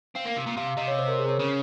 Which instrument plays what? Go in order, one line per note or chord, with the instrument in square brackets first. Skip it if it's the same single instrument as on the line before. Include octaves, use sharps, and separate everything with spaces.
[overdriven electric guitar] C4 [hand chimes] F5
[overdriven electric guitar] A#3
C3
A#2
[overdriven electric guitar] C3 [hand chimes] F5
[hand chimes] F5
[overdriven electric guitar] C3 [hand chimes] D#5
[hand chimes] C#5
C5
A#4
G#4
C#5
[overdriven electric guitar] C#3